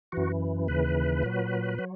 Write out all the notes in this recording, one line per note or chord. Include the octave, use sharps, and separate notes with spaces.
F#2 E3 F#4
D#2 C#3 E3 B4
A#2 F#3
F#3